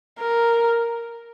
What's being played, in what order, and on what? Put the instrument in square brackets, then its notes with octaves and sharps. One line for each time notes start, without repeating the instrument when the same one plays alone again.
[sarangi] A#4